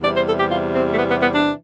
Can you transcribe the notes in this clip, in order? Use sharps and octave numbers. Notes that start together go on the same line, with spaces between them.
E2 C3 E3 G3 D5
C5
A4
G4
F4
C4
A3
B3
B3
B3
D4